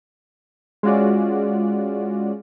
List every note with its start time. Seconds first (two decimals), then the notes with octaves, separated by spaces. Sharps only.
0.83 G#3 C#4 F4 F#4 D5